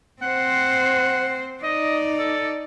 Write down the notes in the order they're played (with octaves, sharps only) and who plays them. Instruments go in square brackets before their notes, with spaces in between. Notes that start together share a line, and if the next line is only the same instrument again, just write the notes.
[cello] C4 C5 [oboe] F#5
[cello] D#4 D5 [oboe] D#5
[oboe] A4